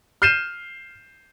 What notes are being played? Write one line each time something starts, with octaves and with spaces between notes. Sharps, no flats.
F6 G6 C7 D#7 E7